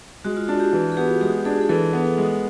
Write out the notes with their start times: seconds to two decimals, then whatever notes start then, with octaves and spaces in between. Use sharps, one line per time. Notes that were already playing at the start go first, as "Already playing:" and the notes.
0.24 G#3 F#4
0.37 F4
0.48 D4 F#4
0.60 G4
0.73 E3
0.92 G#4
0.97 B3 G4
1.21 G#3 G4
1.45 D4 G#4
1.61 G#4
1.69 E3 A4
1.93 B3
2.18 G#3